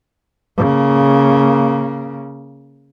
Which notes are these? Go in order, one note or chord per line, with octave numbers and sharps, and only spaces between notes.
C#3 A#3